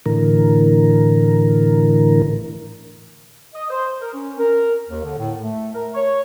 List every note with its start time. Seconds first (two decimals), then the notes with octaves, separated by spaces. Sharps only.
0.06 A2 D3 E3 A#4
3.54 D#5
3.71 C5
4.01 A#4
4.14 C#4
4.39 A#4
4.89 D#2
5.04 D3
5.18 A2
5.41 A3
5.74 A#4
5.94 C#5